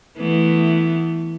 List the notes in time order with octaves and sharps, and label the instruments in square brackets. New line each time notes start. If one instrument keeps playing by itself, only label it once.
[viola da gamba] E3 A3 B3